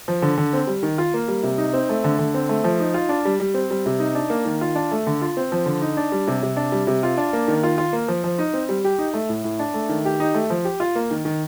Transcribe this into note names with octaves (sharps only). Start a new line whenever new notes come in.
F3
D3
D3
C4
G3
D#3
F4
A#3
G3
C3
D#4
C4
A3
D3
D3
C4
A3
F3
D#4
F4
D4
G3
G3
C4
G3
C3
D#4
D4
A#3
D#3
F4
D4
A3
D3
F4
C4
F3
D3
D#4
D4
G3
C3
C3
D4
G3
C3
F4
D4
A#3
D#3
F4
F4
A#3
F3
F3
D#4
C4
G3
G4
D#4
A3
A2
A2
D4
A3
D#3
G4
D#4
A3
F3
G4
F4
A#3
D#3
D#3